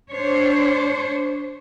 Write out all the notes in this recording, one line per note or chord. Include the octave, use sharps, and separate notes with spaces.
D4 C5 C#5